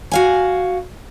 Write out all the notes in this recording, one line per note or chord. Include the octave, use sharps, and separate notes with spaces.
F#4 F5 G#5